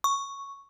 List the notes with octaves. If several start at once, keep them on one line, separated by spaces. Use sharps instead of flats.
C#6